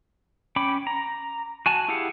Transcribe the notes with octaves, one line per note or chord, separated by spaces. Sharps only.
C#4 G5 B5 D6
A#5
F#4 G#5 A5
E4 G4 G#4 F5 F#5